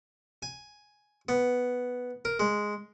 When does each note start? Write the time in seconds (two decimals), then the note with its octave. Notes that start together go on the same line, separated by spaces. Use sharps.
0.42 G#5
1.29 B3
2.25 A#4
2.40 G#3